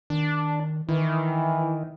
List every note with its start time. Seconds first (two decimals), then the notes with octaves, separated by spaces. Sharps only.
0.10 D#3 D4
0.89 D#3 E3 E4